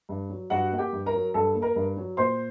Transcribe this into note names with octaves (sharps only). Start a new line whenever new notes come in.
G2
F#3
G2 F#4 F#5
A#3 F#5
G4 G5
G2
A#4 A#5
F#3
G2 A4 A5
A#3
A#4 A#5
G2
F#3
A#2 C5 C6